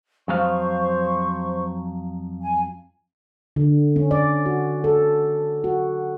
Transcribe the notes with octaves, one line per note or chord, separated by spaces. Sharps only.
F2 F#3 C5 F5 C#6
G#5
D3
C#4
D5
F#4
A4
F#4